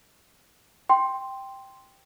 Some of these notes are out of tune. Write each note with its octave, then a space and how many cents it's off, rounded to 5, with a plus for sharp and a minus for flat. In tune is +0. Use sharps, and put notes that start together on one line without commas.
G5 +0 C6 +0